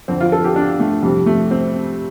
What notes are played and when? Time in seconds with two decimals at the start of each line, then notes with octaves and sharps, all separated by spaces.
0.08 F2 D3 C4
0.20 F4
0.32 A4
0.44 G4
0.56 D4
0.80 A3
1.03 F2 C3 G3
1.27 A3
1.51 C4